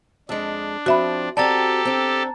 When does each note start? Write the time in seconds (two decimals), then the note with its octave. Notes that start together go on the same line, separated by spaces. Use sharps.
0.29 F2 G#3 D4
0.86 F3 C4 F#4 E5 B5
1.37 C4 F#4 G4 A4 D5 A5 A#5 A6
1.85 C4 D4